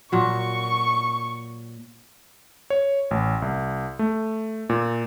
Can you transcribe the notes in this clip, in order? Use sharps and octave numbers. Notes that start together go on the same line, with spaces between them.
A#2 F#3 C#6
C#5
A1
C2
A3
A#2